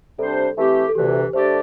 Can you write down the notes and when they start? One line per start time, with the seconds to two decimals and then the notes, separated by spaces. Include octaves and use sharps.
0.19 C3 G3 D4 A4 C5
0.57 E3 A3 C4 G4
0.88 A4
0.95 D2 C3 E3 G4
1.33 D3 A3 D4 G4 C5 D5